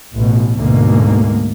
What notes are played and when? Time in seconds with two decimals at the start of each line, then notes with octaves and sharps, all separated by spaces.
0.15 A1 B2
0.58 D2 G#2 B2 A#3